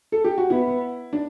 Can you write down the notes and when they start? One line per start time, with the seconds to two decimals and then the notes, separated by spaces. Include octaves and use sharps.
0.12 A4
0.24 G4
0.38 F#4
0.50 B3 E4
1.13 D4